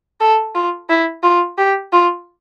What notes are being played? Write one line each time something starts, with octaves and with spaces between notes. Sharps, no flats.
A4
F4
E4
F4
G4
F4